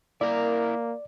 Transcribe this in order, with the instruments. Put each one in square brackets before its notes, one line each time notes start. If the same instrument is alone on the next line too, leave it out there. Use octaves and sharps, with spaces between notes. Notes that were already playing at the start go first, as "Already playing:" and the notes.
[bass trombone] A#3 [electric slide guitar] E4 A#4 [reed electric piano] D5